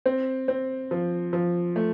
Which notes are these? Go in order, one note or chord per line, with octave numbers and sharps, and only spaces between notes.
C4
C4
F3
F3
A3